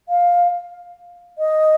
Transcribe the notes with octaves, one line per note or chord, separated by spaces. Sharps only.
F5
D#5